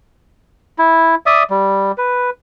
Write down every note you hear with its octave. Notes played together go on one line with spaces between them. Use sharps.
E4
D5 E5 D#6
G3
B4